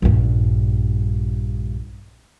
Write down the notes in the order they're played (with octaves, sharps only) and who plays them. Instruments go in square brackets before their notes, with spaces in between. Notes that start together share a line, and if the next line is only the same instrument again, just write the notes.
[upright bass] A#1 G2